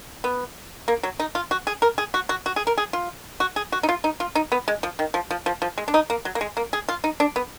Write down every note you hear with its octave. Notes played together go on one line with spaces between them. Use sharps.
B3
A#3
F#3
D#4
F4
F#4
G#4
A#4
G#4
F#4
F#4
F#4
G#4
A#4
G#4
F4
F#4
G#4
F#4
D#4
F4
D#4
F4
D#4
B3
G#3
F3
D#3
F3
F3
F3
F3
G#3
D4
D#4
A#3
F#3
A#3
G#3
A#3
G#4
F4
D#4
D4
B3